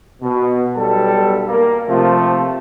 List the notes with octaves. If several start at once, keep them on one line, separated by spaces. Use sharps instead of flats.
B2
B1 G3 A4
A#3
C3 F3 A3 F4